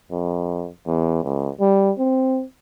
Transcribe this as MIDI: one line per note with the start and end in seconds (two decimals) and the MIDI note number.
0.11 0.68 41
0.87 1.22 40
1.23 1.49 37
1.60 1.92 55
1.99 2.44 60